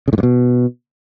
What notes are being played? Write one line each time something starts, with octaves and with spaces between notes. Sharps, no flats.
C#3
A2
G2
B2